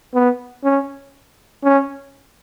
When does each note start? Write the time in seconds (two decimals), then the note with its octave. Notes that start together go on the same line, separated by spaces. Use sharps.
0.14 B3
0.64 C#4
1.63 C#4